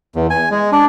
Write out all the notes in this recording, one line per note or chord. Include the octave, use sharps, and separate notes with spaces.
E2
G#5
G#3
D4